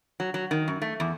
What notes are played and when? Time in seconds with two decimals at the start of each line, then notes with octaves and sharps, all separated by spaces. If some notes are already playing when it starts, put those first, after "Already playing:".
0.20 F#3
0.34 F#3
0.51 D#3
0.68 F#2
0.82 A3
1.00 E2